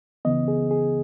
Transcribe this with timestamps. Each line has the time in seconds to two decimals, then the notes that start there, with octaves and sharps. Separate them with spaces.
0.25 C#2 C#3 E3 B3 D#5
0.48 G#4
0.71 G#4